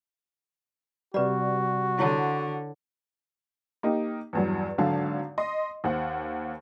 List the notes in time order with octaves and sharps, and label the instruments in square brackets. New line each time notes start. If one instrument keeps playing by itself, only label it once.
[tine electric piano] C3 G3 [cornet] F#4 [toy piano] B4 D5
[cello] D3 [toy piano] E4 C#5 A5
[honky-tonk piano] A#3 D#4 G4
E2 G2 F#3
G#1 D3 F#3 F5 A5
D#5 C6
D#2 C5 F#5